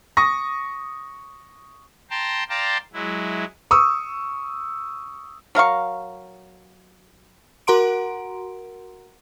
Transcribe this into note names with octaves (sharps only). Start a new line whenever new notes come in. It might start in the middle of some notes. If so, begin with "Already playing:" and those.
C#6 D#6 A#6
G5 A5 A#5 C6
D5 F5 G5 A5 A#5 C6
F#3 G#3 E4
C#6 D#6 E6
F#3 A#4 F5 C#6
F#4 A#4 F#5 A#5 C6 D7